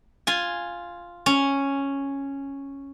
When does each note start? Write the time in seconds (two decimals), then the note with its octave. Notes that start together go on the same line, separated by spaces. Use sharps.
0.27 F4 G#5
1.26 C#4